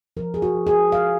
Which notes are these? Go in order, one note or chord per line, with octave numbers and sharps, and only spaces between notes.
F3 A#4
G#4
F#4
F3
G#4
F3 F5